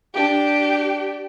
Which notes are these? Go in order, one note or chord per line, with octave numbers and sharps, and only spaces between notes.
D4 G4